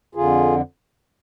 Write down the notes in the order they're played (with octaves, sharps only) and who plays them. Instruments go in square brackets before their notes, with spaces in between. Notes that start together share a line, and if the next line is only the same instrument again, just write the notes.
[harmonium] F2 D3 F4 G#4